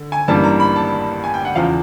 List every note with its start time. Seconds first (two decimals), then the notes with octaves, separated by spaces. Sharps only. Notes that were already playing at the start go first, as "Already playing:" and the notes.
Already playing: D3
0.12 G#5
0.28 A1 G2 E3 G3 A#3 A5
0.44 A#5
0.60 B5
0.76 A5
1.24 G#5
1.34 G5
1.45 F#5
1.55 E2 C#3 F3 F5